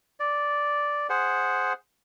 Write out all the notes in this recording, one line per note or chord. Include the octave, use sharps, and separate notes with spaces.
D5
G#4 C5 F#5